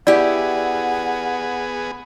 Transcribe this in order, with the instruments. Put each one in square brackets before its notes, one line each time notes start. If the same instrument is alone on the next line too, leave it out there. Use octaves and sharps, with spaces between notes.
[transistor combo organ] B3 G#4 [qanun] E4 G4 [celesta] D5 [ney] F#5